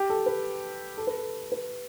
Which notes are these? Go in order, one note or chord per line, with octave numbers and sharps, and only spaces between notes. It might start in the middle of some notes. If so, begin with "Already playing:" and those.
Already playing: G4
A4
B4
A4
B4
A4
B4